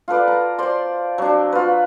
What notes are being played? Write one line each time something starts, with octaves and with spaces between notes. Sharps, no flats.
F4 A4 B4 D5
A#5
C5 D5 A5 C6
F#3 D4
F4 B4